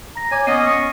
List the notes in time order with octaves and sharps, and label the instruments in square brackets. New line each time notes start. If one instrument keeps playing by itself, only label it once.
[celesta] A#5 A#6
[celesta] C#5 D6 [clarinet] G#5
[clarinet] B3 [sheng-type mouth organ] C#4 D#5 [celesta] C7 D#7
[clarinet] C#6